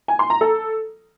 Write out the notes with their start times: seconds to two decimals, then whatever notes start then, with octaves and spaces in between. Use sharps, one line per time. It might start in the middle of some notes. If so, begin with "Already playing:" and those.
0.08 G#5
0.19 C6
0.30 A#5
0.41 A4